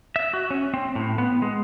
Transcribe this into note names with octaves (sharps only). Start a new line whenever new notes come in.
E5
F#4
C#4
C4
A2
B3
G#3